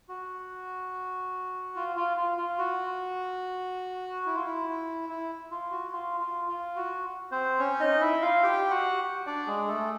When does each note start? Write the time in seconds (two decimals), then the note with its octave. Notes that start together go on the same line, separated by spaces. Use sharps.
0.09 F#4
1.76 F4
1.96 F4
2.17 F4
2.38 F4
2.59 F#4
4.26 E4
4.35 F4
4.45 E4
5.09 E4
5.51 F4
5.71 F#4
5.93 F4
6.20 F4
6.48 F4
6.76 F#4
7.31 C4 C5
7.59 C#4 C#5
7.80 D#4 D#5
8.01 E4 E5
8.22 F4 F5
8.43 G4 G5
8.70 F#4 F#5
9.26 D4 D5
9.47 G#3 G#4
9.68 A3 A4